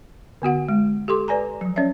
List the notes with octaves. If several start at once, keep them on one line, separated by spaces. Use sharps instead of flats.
D3 B3 F#4 F#5
G#3
G4 A4 C6 D6
B4 D5 G#5 A#5
F3 F#3
C#4 C#5 D5 E5